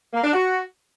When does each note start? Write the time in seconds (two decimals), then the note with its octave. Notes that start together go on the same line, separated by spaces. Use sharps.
0.13 A#3
0.23 D4
0.33 F#4